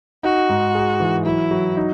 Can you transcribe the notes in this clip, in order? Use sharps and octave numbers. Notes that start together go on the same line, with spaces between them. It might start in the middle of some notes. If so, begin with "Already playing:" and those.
D#4 F#4
G#2
G#4
E3
F#3 E4
F#3
D#4